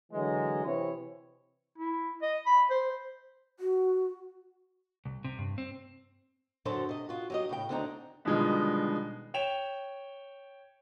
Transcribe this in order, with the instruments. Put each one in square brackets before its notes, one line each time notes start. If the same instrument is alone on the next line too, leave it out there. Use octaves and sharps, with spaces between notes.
[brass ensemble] D3 E3 F#3 G#3
C3 E3 C4 E4 C#5
[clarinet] E4
D#5
B5
C5
[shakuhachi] F#4
[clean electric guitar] C2
C3
G2
C4
[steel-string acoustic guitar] F#2 D3 F#3 A4 C5 D5
C3 D#5
F4 F#4
F#3 G4 D#5
A2 C#3 G5
D2 D3 C4 D4 D#4 A#5
[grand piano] B2 D3 D#3 F3 G3 G#3
C#5 G5 E7 F7